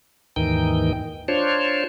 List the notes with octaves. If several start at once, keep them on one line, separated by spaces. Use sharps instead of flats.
D#2 G#2 D#3 E3 D#4 G5
D4 F4 C5 C#5